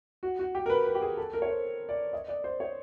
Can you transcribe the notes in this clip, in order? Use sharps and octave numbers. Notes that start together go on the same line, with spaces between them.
F#4
F#4
G4
A#4
B4
B4
G4
G#4
A4
A#4
C#5
C5
D5
D#5
D5
C5
C#5